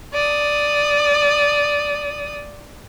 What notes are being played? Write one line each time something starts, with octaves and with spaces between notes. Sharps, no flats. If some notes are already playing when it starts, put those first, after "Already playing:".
D5 D#6